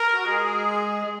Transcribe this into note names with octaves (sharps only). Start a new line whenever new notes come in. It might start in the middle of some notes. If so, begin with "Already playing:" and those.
Already playing: A#4
F#4
G#3 G#4